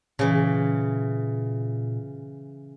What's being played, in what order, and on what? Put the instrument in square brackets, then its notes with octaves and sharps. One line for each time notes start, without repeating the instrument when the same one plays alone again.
[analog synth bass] A#2 [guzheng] C#3 E3